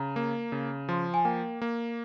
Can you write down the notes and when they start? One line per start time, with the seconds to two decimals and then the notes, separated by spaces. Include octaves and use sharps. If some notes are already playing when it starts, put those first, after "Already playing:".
Already playing: C#3 A#5
0.16 A#3
0.52 C#3
0.89 F3 C6
1.14 G#5
1.25 A#3 G5
1.62 A#3